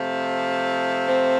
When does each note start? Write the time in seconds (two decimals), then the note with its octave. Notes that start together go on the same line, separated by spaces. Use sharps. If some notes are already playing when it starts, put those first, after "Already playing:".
Already playing: C3 F3 A3
1.07 C4